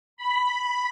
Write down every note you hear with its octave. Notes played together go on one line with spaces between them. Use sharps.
B5